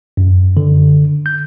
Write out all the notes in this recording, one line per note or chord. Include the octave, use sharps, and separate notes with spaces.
F#2
D3
G6